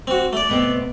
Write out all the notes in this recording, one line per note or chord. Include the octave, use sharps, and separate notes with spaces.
C4 F#4
A3 D5
B2 B3 C4